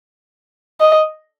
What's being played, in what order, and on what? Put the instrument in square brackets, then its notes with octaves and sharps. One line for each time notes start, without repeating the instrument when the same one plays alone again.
[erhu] D#5